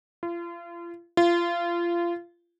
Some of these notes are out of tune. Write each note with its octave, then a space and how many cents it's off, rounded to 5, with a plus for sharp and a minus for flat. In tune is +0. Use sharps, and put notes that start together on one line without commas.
F4 -35
F4 -25